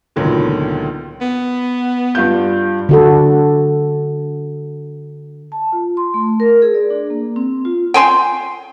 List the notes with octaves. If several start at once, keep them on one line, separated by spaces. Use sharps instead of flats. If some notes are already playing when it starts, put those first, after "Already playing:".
C#2 A#2 D3 D#3 F#3 B3
B3
G2 F4 G6
D3 F#4 A4
A5
F4
C6
A3
A#4
G#4
D5
D4
A#3
C4
F4
G5 G#5 C6